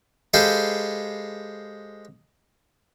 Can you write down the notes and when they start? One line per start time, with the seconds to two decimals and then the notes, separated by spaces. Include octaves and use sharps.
0.34 G#3 G4 A4 B4 C5 F5